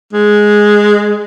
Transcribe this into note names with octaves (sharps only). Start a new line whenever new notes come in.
G#3